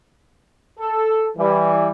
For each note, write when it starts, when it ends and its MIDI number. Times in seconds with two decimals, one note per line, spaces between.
0.79 1.27 69
1.37 1.89 52
1.37 1.89 55